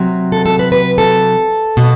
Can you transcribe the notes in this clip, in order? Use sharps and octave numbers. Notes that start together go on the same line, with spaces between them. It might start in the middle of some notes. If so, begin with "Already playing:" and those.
Already playing: C3 F#3
A4
A4
B4
B4
A4
B2